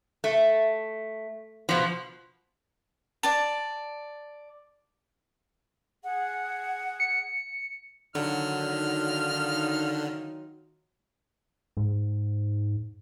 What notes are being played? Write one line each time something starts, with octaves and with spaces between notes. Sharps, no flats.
A3
B2 F3
D5 A5
G#4 F#5
C#7
D3 D#3 F#3 D#4 F4 F6
G#2